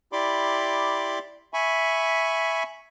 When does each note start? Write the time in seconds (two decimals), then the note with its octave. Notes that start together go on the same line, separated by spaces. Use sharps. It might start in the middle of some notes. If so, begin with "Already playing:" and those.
0.13 E4 G4 D5 B5 C6 D6
1.54 E5 G#5 B5 C#6